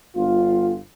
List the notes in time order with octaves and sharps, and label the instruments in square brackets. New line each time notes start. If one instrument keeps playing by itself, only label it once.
[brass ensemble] G1 F4